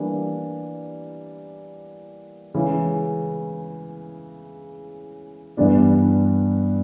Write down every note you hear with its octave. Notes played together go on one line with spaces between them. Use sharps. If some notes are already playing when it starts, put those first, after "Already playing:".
Already playing: E3 G3 A#3 D4
C#3 E3 G#3 C#4
G2 E3 G3 B3 D4